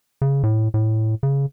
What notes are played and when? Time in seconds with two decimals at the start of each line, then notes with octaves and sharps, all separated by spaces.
0.22 C#3
0.43 A2
0.74 A2
1.23 C#3